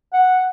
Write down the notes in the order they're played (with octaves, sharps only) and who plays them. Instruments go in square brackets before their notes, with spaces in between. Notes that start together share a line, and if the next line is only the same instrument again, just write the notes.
[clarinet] F#5